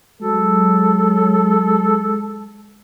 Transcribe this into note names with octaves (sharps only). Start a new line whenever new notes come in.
F#3 G#3 A4